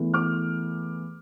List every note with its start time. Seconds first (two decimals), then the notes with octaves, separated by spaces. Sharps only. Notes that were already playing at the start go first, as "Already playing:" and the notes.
Already playing: E2 E3 A3
0.14 D6 F6